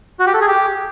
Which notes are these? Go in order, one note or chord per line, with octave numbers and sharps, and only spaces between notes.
F#4
G4
A4
G#4
G4